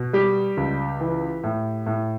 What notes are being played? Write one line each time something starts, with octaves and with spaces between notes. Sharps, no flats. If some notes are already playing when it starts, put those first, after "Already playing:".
Already playing: B2
G3 G4
C#2
E3
A2
A2